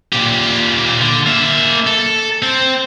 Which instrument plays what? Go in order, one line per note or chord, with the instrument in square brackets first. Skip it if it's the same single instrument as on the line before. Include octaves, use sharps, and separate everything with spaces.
[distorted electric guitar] A#2 G4
D3
A#3 E5
A4
C4